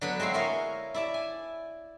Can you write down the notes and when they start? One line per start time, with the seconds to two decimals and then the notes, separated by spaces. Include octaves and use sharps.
0.01 D3 F#3 B3 B4 B5
0.20 G#3 C4 F#4 F5
0.34 E4 A#4 C#5 D#5 F5
0.94 E4 D5 A5
1.14 G#5